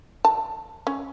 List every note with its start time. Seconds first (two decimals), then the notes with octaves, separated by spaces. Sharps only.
0.25 A5
0.87 C#4